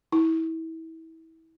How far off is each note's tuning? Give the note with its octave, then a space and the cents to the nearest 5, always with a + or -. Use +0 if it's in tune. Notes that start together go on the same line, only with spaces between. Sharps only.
E4 -30